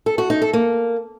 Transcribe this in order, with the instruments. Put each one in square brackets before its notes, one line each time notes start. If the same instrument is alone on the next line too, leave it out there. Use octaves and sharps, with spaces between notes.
[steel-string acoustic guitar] A4
F#4
D#4
A4
A#3